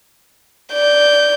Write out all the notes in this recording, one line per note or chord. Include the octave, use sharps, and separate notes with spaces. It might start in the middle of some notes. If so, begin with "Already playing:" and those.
D5 G6